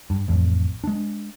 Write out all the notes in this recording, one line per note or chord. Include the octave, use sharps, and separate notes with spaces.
G2
A1 F2
G#3 D4